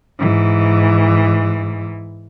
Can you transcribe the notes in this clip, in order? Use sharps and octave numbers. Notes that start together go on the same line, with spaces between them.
G#2 E3